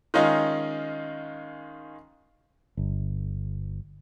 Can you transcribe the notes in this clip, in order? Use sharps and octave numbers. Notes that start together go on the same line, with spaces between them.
D#3 G#3 C#4 D#4 F4
G1